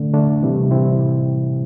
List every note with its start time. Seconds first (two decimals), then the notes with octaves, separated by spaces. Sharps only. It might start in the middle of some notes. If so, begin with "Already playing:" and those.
Already playing: D3 A3 D4
0.13 D3 A3 D4
0.42 C3 E3 G3 C4 E4
0.71 C3 E3 G3 C4 E4